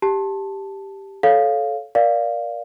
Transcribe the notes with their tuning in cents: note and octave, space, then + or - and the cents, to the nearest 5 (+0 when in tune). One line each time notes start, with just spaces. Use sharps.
G4 +0 A5 +0
A4 -15 C#5 +0 F5 +0
A#4 +25 D5 +0 F5 +0